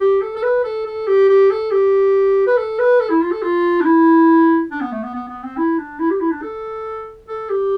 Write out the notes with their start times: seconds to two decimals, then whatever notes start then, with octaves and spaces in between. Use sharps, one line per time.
0.01 G4
0.21 A4
0.36 A4
0.43 B4
0.64 A4
0.86 A4
1.07 G4
1.29 G4
1.50 A4
1.71 G4
2.47 B4
2.57 A4
2.79 B4
3.00 A4
3.10 E4
3.21 F4
3.31 A4
3.42 F4
3.80 D4
3.85 E4
4.71 D4
4.81 B3
4.92 A3
5.03 B3
5.14 B3
5.28 B3
5.43 C4
5.57 E4
5.78 D4
5.99 E4
6.10 G4
6.20 E4
6.31 D4
6.42 A4
7.28 A4
7.49 G4